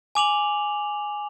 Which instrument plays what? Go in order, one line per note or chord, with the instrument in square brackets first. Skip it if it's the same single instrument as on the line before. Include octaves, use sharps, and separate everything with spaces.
[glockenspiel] G#5 D6 F7 F#7